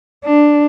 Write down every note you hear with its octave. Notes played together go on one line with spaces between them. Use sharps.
D4